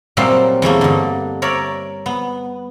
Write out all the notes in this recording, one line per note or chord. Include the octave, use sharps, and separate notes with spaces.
A#2 F#3 G3 C4 E5 F5
E2 E3 A3 A#3
G2 D3
A#4 C#5 D5 E5
B3